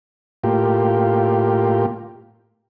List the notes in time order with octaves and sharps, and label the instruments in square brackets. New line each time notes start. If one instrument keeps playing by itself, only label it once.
[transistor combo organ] A2 A#3 F4 G4